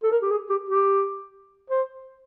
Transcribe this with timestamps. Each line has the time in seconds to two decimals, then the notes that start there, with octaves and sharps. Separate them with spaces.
0.03 A4
0.12 A#4
0.22 G4
0.31 G#4
0.50 G4
0.69 G4
1.70 C5